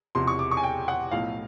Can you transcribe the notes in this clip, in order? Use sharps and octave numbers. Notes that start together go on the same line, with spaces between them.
E1 E2 C3 F3 C6
C#6
D6
C#6
G#5
G5
F#5
B1 A2 F3 F5